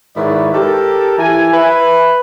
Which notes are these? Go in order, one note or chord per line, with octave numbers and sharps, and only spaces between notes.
G#2 D#3 E4 B4 C#5 D5
G4 A4 A#4
E3 G#5
B4 E5